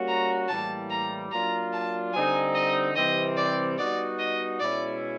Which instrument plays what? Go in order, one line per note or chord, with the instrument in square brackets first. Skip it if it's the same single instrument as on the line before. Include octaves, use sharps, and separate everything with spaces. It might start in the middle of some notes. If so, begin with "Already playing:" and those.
Already playing: [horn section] G3 A#3 C#4 F#4
[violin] A#5
[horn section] A2 E3 G3 A#3 [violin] A5
[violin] A#5
[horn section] F#3 A#3 D4 F4 [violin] A#5
[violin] A5
[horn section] D3 G3 C4 D#4 [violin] G#5
[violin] D#5
[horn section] C3 E3 G3 C4 [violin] D#5
[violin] D5
[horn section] G3 B3 D#4 F#4 [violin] D5
[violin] D#5
[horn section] B2 G#3 C#4 E4 [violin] D5